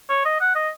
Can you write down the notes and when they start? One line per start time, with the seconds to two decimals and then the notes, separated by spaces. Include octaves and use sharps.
0.09 C#5
0.25 D#5
0.40 F#5
0.55 D#5